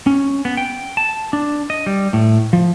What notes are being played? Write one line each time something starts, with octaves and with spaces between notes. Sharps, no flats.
C#4
B3
G5
A5
D4
D#5
G3
A2
F3